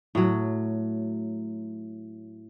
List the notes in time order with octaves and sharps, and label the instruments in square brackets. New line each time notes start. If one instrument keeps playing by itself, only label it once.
[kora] A2 F#3